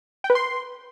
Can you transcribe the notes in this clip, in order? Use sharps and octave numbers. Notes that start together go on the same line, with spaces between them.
G5
B4
C6